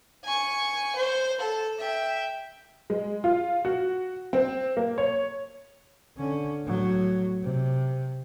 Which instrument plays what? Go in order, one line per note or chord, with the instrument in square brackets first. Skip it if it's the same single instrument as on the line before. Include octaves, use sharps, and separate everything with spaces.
[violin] G#5 C#6
C5
A4
E5 G5
[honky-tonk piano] G#3
F4
F#4
C4
A#3
C#5
[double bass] D3 C#4
A2 F#3
C3